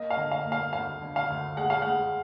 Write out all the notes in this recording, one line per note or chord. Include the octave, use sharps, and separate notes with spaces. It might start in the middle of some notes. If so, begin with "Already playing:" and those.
Already playing: A#3 D#5
F5
D3
F5
A#3
F5
D2 F5
D3
F5
D2
G#3 F#5
F5
G#3 F#5